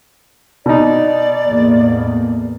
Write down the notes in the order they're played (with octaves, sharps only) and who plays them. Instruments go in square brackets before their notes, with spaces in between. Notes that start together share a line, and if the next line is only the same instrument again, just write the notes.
[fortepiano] B2 D#4 [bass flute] D5
[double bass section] E2 A2 A#3